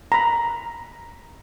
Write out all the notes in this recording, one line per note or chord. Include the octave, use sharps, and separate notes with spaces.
A#5 B5